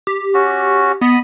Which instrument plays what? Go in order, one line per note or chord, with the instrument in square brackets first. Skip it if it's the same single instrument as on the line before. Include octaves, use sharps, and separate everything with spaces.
[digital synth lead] G4
[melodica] C#4 F#4
[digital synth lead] B3 [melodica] D#5 B5 D#6